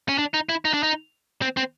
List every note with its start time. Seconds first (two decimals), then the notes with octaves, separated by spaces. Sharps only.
0.09 C#4
0.18 D4
0.34 D#4
0.49 E4
0.65 D#4
0.74 D4
0.83 D#4
1.42 C4
1.57 C4